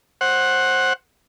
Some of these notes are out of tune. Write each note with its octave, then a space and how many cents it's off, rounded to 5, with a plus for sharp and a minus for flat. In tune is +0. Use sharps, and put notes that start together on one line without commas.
C5 +20 F#5 +0